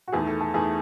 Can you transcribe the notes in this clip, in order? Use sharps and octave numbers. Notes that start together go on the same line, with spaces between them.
F#4
E2 D#3 A3 G#4
A4
A4
E2 D#3 A3 G#4